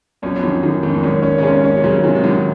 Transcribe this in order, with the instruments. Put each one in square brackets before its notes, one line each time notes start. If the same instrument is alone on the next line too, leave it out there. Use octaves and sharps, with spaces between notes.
[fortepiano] F#2 A#2 [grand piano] C#4
[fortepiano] F2
[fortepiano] F#2 [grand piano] D#3
[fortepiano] F#2 [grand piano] D#3
[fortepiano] F2 G#2 [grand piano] D#3
[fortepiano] G#2
[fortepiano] F#2 A#2 [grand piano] C#4
[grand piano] C#4
[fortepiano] C#3
[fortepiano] G#2 C3 [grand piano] C#4
[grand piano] C#4
[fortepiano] C3
[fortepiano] A#2 C#3 [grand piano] F#3
[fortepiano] G#2 C3 [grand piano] D#3
[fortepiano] C3
[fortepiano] F#2 A#2 [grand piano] D#3